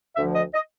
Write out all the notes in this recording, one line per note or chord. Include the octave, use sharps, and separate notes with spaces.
D2 D3 F3 E5
D#5
D#5